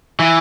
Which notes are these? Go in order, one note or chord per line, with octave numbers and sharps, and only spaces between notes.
E3